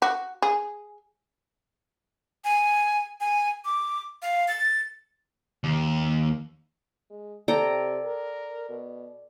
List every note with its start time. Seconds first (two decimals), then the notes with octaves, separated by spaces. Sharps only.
0.02 F#4
0.42 G#4
2.44 G#5
3.20 G#5
3.65 D6
4.22 F5
4.48 A6
5.64 D#2
7.10 G#3
7.48 C3 A4 D5 G5 A#5
8.04 A#4
8.69 B2